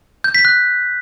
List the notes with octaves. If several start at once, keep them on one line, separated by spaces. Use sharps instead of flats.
G6
B6
F#6